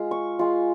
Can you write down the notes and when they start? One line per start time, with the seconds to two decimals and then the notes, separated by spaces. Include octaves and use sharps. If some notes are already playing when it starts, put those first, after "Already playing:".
Already playing: G#3 F4
0.11 C#6
0.39 G#3 F4